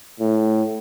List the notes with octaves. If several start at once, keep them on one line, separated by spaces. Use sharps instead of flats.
A2